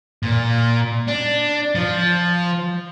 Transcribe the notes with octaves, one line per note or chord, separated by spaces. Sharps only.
A#2
D4
F3